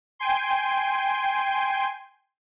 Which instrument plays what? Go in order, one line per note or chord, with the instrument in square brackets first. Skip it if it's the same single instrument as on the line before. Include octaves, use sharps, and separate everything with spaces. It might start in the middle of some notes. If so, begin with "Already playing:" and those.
[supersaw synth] G5 G#5 C6